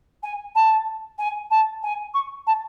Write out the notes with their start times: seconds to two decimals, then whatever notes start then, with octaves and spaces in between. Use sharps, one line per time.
0.23 G#5
0.55 A5
1.18 G#5
1.50 A5
1.83 G#5
2.14 C#6
2.47 A5